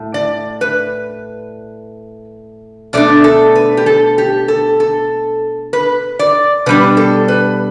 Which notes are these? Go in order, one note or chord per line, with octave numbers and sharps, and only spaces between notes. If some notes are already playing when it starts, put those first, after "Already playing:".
Already playing: A2
D5
B4
B2 A3 D4 D5
A4
B4
G4
A4
G4
A4
A4
B4
D5
B2 G3 D4 B4
A4
B4